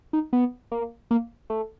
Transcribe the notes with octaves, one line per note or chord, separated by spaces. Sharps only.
D#4
B3
A#3
A#3
A3